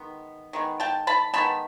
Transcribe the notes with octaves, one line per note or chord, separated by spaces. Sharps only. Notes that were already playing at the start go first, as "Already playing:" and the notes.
Already playing: D#3 G#3 B3
D#3 G#3 B3
G5 A5
A5 B5
D#3 G#3 B3 A5 B5